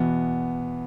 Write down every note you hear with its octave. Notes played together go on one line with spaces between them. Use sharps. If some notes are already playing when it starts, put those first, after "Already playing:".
Already playing: E2 B2 B3